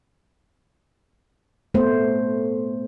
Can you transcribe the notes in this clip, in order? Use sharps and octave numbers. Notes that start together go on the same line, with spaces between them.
A3 B3 C5